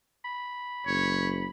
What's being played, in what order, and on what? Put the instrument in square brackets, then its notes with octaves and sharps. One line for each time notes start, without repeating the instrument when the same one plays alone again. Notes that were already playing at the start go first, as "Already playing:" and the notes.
[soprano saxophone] B5
[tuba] F#1 [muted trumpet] C#5